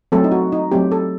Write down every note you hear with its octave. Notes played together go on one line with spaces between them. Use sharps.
F#3 A3 C4 A4
D#4
F#4
D#4
F#3 A3 C4 G4
A4